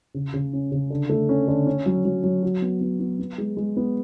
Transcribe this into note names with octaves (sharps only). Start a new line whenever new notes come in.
C#3
C#3
C#4
C#3
D3
A3
C#4
D3
C#4
F#3
F#3
F#3
F#4
B3
B3
B3
B3
G#3
G#3
B3